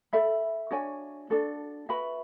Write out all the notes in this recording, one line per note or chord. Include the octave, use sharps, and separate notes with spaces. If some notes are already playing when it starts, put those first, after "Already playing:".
A4 E5 B5
D4 F#4 C#5 G#5
D4 F#4 A4
F#4 B4 E5 B5